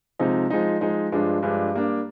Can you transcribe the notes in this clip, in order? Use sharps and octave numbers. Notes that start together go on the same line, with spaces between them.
C3 F3 G#3 D#4
F3 G#3 D#4
F3 G#3 D#4
G2 F3 G#3 D4
G2 F3 G#3 D4
G3 A#3 D4